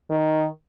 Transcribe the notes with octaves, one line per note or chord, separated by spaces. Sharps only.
D#3